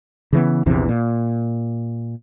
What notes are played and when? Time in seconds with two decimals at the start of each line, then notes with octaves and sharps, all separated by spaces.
0.33 C#3 E3 B3
0.66 A#1 E2 C3 E3
0.89 A#2